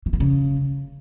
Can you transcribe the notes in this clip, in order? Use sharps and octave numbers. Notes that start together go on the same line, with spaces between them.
E3
D#3
C#3